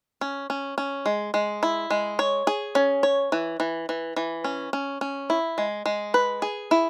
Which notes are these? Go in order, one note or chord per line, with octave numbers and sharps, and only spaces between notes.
C#4
C#4
C#4
G#3
G#3
E4
G#3
C#5
G#4
C#4
C#5
E3
E3
E3
E3
C#4
C#4
C#4
E4
G#3
G#3
B4
G#4
E4